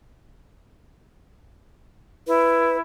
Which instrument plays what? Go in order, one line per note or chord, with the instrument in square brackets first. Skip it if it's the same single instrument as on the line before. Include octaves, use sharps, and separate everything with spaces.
[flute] E4 [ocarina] B4